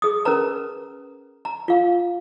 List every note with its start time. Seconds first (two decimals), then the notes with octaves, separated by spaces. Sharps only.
0.02 G#4 D#6
0.25 C#4 A#4 B4 A#5
1.45 A#5
1.68 F4 F5